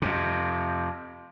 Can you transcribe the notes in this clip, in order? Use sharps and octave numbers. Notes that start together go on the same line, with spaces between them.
F2 C3